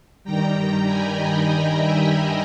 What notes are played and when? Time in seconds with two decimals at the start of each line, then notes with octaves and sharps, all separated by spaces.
0.24 G2 D#3 G3 G5 A#5
0.85 G#5 B5
1.15 D#5 G5
1.45 D#5 G5
1.76 E5 G#5
2.06 G5 A#5